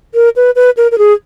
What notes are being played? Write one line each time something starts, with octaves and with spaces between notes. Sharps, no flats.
A#4
B4
B4
A#4
A#4
G#4